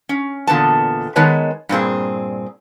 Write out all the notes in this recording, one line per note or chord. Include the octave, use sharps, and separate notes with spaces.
C#4
E2 A#2 D3 B3 A5
D#3 G#3 B3 B4 C#5 A5
G2 A#2 C4 G#4